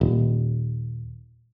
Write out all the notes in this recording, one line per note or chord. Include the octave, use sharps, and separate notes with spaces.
D#1